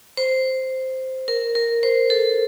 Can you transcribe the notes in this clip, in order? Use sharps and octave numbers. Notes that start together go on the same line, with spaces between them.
C5
A#4
A#4
C5
A4